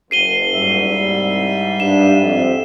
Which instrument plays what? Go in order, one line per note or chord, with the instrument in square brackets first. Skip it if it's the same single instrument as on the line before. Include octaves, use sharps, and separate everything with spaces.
[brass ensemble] F#1 [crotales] C7 D#7 G7
[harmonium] G#2 G3 E5
[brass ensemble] C2
[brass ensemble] G2 [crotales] E7
[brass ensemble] F2